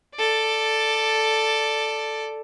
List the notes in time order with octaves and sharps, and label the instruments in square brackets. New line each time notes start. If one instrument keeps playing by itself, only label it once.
[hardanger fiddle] A4 D5